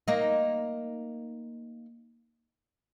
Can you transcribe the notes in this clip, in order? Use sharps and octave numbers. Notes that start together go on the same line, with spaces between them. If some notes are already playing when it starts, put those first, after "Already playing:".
A#3 D#4